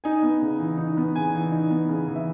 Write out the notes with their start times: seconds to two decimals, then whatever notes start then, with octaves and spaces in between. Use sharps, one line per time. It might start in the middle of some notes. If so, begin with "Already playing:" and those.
0.04 D#4 G#5
0.23 B3
0.42 C#3
0.60 E3
0.78 D#4
0.97 B3
1.15 C#3 G#5
1.34 E3
1.52 D#4
1.70 B3
1.89 C#3
2.08 E3
2.16 E5